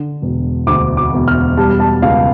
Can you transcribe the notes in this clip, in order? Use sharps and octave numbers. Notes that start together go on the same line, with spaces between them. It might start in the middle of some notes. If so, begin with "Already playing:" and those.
Already playing: D3
E1
D2 D6
D6
E1
F6
G3 A5
A5
C#2 F5